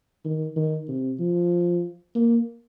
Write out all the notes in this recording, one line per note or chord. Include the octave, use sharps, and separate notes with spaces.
D#3
D#3
C3
F3
A#3